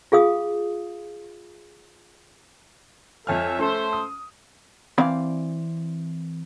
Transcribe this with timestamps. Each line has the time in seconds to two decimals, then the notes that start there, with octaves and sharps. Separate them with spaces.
0.12 F4 G#4 F5 D#6
3.27 F2 A4 C#5 E5 G#5 F6
3.59 A3 C#4 A4 C5
3.93 D#6
4.98 E3 C4 D5 F5 B5